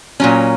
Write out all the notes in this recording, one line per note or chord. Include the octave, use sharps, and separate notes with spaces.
A#2 F#3 C#4